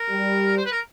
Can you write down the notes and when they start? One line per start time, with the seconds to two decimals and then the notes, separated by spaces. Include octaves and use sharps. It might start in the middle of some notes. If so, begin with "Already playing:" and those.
Already playing: A#4
0.10 G3
0.57 C5
0.65 B4
0.72 A#4